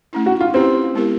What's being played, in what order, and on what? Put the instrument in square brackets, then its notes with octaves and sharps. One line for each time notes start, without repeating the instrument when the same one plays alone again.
[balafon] A3 C#4 E4
[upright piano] F#4
F4
[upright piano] C4 [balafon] C#4 E4 G4 B4
[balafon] G#3 B3 E4 G4 A#4